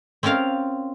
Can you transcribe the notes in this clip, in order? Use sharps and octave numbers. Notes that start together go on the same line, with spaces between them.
C4 C#4 F4 A#4 F5